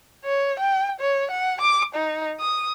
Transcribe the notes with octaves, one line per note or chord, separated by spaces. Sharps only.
C#5
G5
C#5
F#5
D6
D#4
D#6